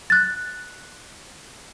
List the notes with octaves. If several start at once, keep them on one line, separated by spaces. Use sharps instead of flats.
F#6 A6